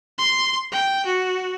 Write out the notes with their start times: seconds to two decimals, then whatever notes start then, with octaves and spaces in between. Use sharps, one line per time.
0.18 C6
0.72 G5
1.06 F#4